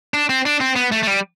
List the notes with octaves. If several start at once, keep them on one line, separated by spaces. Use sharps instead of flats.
D4
C4
D4
C4
B3
A3
A3
G3